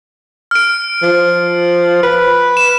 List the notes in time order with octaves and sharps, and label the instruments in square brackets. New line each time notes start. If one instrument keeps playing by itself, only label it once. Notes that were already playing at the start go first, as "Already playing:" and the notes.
[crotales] F6 D7
[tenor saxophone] F3
B4
[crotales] E7